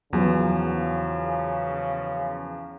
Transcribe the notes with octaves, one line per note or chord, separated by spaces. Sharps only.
E2 C#3 F3 F#3 B3